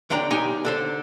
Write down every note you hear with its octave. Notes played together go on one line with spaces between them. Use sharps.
E2 D3 D4 G5 A#5
B1 D#4 G4 G#5
D3 A4 C5